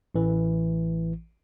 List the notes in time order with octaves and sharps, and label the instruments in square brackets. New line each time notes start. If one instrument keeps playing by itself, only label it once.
[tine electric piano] A1 E3